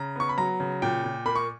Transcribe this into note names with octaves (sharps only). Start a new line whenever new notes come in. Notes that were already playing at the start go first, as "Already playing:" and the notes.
Already playing: C#3 A#5
B3 C#6
B5
F#3 A#5
C#3
A#2 G5
A#2
A#3 B5
C#6